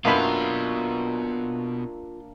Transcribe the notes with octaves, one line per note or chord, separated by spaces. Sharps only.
B1 F#2 B2 A#3 D4 F4 E5 B5